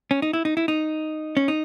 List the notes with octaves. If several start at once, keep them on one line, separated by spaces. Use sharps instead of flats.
C#4
D#4
E4
D#4
E4
D#4
C#4
D#4